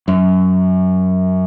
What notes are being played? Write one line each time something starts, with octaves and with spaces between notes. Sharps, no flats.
F#2